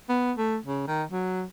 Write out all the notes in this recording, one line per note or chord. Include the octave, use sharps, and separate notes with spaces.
B3
A3
C#3
D#3
F#3